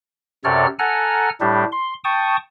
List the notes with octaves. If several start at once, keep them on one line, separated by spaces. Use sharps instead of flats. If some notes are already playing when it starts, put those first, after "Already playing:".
F#2 C3 A4 C#5 D5 F6
A4 F#5 G#5 A#5 F6
A2 G3 D4 G4
C6
G5 A5 C#6 D#6